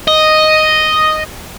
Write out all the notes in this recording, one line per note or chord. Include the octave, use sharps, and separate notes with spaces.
D#5